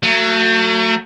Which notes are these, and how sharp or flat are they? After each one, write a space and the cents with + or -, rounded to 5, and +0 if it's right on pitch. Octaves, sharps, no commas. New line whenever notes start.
F#3 +0 A3 +35